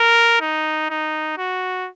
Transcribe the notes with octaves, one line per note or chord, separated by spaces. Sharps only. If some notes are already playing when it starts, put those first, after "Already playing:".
Already playing: A#4
D#4
D#4
F#4